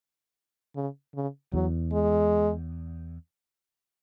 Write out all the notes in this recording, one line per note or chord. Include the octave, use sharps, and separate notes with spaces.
C#3
C#3
E2 F#3
G#3